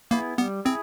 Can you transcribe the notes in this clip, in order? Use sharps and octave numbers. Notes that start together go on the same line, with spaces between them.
A#3 B3 E4 G#4
G3 B3
C4 E4 G#4